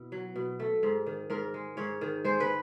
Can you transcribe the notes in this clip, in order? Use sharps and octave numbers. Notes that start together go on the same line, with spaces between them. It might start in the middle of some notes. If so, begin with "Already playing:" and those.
Already playing: B2 E4
F#3
B2
A3
G#2
D#3
G#2 A#4
G#3
G#2 C#5
D#3
G#3 C5
B4